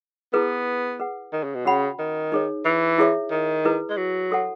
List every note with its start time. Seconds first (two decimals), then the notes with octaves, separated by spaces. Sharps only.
0.33 B3 E4 G#4 B4
1.00 G#4 B4 F#5
1.33 D#3
1.44 C#3
1.55 B2
1.65 C#3 C#4 F#4 C#5 F#5 B5
1.99 D#3
2.32 D#4 G#4 C#5
2.65 E3
2.98 E4 G#4 C#5 E5
3.31 D#3
3.65 E4 G#4 B4
3.90 G#3
3.97 F#3
4.31 F#4 A4 C#5 F#5 A5